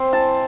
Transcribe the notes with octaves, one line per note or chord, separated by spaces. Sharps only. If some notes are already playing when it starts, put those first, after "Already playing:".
Already playing: C4 C6
E3 A5